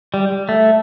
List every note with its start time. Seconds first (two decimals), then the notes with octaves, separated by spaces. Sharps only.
0.14 G3
0.49 A3